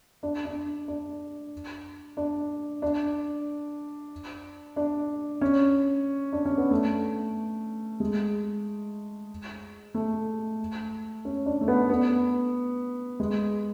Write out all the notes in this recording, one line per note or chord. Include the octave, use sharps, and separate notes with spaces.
D4
D4
D4
D4
D4
D4
C#4
D4
C#4
B3
A3
G#3
A3
C#4
D4
A3
B3
B3
G#3